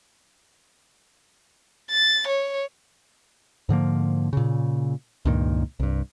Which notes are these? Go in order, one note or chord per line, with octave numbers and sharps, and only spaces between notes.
A6
C#5
G#2 D3 F3 A#3
A#2 C#3
C#2 G2 A#2 D#3
C2 G2